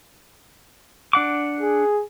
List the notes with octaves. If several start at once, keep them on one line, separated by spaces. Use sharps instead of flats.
D4 F#5 D6
G#4